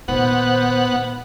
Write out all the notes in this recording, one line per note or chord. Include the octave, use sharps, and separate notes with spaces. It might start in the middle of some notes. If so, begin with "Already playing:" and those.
A#2 D#3 B3 C5 F#5